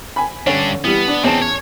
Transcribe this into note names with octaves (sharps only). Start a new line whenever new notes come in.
G#5 B5
G2 D3 C#4 D4
E3 G3 B3
D4
E2 C4 C#4 D#4 A5
C#5